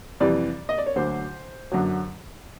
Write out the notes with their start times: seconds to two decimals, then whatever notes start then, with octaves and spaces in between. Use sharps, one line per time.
0.20 F2 C3 E3 G3 D5
0.69 D#5
0.78 D5
0.86 C#5
0.96 D2 D3 F#3 C5
1.71 F#2 D3 F#3